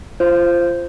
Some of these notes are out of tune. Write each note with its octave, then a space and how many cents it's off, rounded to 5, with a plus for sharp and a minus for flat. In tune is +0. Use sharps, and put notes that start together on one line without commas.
F4 -25 C5 +0